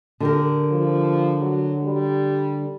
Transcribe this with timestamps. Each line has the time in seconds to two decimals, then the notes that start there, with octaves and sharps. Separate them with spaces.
0.20 D3 G4 A#4
0.71 F3
1.41 F#3
1.83 G3